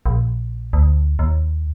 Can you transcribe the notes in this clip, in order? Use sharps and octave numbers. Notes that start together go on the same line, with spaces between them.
A#1
D2
D#2